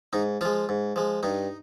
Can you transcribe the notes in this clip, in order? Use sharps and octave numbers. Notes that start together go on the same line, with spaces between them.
G#2 D#4
F3 G#3 F4
G#2
F3 G#3
G2 D#4